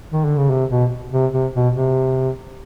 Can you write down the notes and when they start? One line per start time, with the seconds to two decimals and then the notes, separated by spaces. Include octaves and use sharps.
0.12 D#3
0.25 D3
0.37 C#3
0.50 C3
0.70 B2
1.12 C3
1.32 C3
1.54 B2
1.74 C3